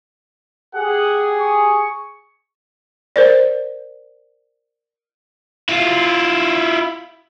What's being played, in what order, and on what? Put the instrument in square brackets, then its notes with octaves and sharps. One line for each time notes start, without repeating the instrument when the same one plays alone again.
[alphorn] G4 [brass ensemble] G#4 [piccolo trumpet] F#5
[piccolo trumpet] C#6
[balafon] A#4 C5 D5
[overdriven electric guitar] E4 F4